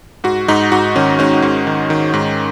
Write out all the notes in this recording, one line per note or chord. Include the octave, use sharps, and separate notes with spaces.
G#2 F#4
G#2 D#4
G#2 F#4
D#3 C#4
G#2 C#4
G#2
D#3
D#3
G#2